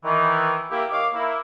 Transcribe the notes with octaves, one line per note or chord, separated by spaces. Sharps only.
D#3 E3
A#3 E4 G4
D#3 C#5 D#5 F5 D6
A#3 E4